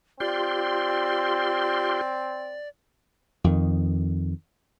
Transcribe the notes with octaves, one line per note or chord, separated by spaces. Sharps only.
C4 F4 G4 D5 C6
F2 D#3